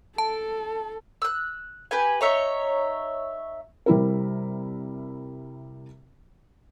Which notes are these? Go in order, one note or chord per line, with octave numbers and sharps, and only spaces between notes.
A4 A5
E6 F#6
G4 B4 G#5
D#4 C#5 E5
C3 G3 E4 A#4